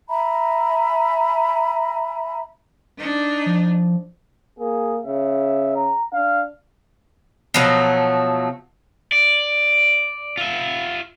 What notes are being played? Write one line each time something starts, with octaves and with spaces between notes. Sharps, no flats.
E5 G#5 A#5 B5
D4 D#4
F3
A#3 G#4
C#3 E5
A#5
D4 F5
B2 F3 F#3 A3
D5
F4 E5